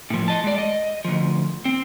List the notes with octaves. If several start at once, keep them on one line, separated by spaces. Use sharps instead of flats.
A2 F3
D#5 A5
G#3 D5
D#5
D2 F3
C4